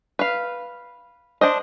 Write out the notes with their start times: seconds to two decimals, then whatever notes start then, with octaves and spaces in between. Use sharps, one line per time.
0.19 B4 F5
1.41 D4 C5 D#5